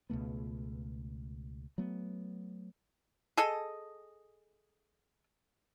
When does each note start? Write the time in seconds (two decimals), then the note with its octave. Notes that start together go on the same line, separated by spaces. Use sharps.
0.10 C#2 B2 A3 B3
1.78 F#3 A3 B3
3.37 G#4 A4 D#5